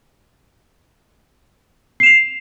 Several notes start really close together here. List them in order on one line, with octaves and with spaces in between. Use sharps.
C7 E7 F7